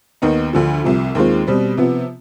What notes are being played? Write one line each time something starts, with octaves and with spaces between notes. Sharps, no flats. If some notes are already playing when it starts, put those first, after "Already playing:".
D#2 D#3 B3 D#4
D2 D3 F3
C2 C3 F3
D#2 D#3 G#3 C4 F4
B2 G3 C4
C3 F3 B3